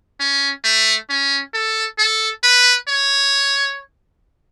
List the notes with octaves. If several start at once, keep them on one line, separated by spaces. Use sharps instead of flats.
C#4
A3
C#4
A4
A4
B4
C#5